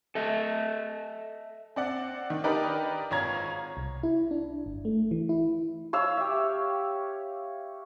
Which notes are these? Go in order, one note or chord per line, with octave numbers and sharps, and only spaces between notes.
A4 D#5 E5
C4 D5 F#5
D#3
D4 D#4 G4 A#4 B4 D5
G#1 F4 C#5 A#5 G#6
C2
E4
D4
G1
A3
E3
E4
C#5 F5 E6
G4 E5